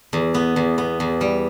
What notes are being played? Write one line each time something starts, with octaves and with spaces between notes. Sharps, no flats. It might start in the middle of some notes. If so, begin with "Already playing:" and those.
E2
B3
E2
B3
E2
G3